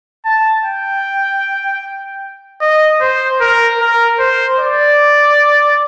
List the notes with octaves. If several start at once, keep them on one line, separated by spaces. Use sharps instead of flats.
A5
G5
D#5
C5
A#4
A#4
C5
D5